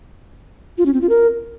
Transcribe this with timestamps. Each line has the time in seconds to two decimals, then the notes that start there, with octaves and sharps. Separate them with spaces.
0.78 F4
0.86 C#4
0.94 C4
1.01 F4
1.09 A#4